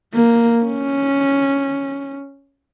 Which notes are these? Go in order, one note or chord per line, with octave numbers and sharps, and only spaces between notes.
A#3
C#4